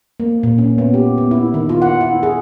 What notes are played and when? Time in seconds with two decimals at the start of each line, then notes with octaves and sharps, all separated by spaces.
0.20 A#3
0.43 A#2
0.58 C#4
0.78 B3
0.94 G4
1.18 B3
1.31 E4
1.54 D#3
1.69 F4
1.82 F#5
2.01 E4
2.23 G#4